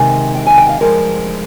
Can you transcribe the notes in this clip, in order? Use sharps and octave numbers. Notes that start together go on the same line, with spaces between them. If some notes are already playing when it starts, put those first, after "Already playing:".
Already playing: C3 D#3 G#3 G#5
G5
G#5
G5
F5
G2 F3 G#3 A#4